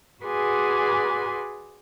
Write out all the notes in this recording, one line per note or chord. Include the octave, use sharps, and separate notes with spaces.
F#4 G#4 B4 D5 G#5 C6